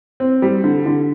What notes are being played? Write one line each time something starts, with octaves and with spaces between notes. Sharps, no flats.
C4
G3
D3
D3